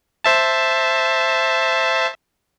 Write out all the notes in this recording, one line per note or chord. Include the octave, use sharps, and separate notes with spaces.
C5 E5 A5